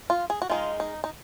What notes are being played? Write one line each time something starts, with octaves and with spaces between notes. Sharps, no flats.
F4
G#4
F#4
D#3 G#3 D#4 F4
D#4
D#4